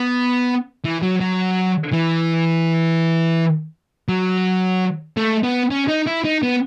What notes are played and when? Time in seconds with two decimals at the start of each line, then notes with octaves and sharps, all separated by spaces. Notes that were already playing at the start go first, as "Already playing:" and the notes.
Already playing: B3
0.84 E3
1.02 F#3
1.20 F#3
1.92 E3
4.09 F#3
5.17 A3
5.43 B3
5.70 C#4
5.88 D#4
6.06 E4
6.24 D#4
6.43 B3